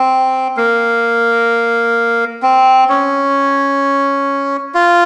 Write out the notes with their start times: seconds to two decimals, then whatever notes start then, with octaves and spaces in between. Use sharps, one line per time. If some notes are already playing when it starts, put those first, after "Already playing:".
Already playing: C4
0.57 A#3
2.43 C4
2.89 C#4
4.74 F4